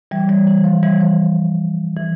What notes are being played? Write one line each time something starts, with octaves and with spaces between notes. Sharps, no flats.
E3 G3
E3 G3
E3
F3
E3 G3
F3
E3